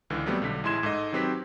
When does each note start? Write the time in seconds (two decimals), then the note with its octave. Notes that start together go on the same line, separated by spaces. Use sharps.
0.10 C#2 D3 E3
0.26 F#3 G3 A3 B3 C4
0.42 B1 D3 B6
0.64 A1 G#3 E4 C6 G#6 E7
0.83 G#2 A4 D#5
1.12 D#3 F#3 C4 G4 B4 B6